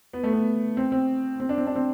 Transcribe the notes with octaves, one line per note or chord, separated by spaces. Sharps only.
B3
A3
B3
C4
C4
C4
D4
C4
D4
C4